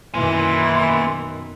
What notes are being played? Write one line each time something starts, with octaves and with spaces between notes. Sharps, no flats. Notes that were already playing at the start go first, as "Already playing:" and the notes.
F#2 B2 D#3 E3 A#3 G#5 C6